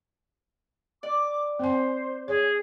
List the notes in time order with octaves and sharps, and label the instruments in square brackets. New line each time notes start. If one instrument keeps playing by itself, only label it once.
[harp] D5 [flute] D6
[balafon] C4 G#5 [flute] C5
[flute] G#4 [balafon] C#5